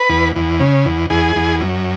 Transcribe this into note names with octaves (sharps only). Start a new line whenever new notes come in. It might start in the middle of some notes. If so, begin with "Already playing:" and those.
Already playing: B4
E2
E2
C#3
E2
E2 G#4
E2
F#2